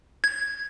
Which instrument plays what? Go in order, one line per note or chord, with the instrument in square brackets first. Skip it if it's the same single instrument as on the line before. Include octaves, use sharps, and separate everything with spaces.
[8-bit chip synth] G#6